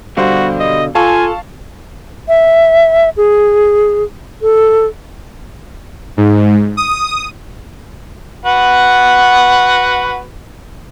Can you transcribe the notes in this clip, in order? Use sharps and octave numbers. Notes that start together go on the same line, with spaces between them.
B2 D3 G3 F#4 C5 F5
D#5
F4 A4 F5 G#5 A5 C#6
E5
G#4
A4
G#2
D#6
F#4 B4 F#5